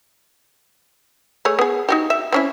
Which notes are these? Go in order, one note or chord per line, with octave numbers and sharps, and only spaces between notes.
A3 G#4 C#5
B3 G#4
D#4 F#4 G4
E5
C4 C#4 E4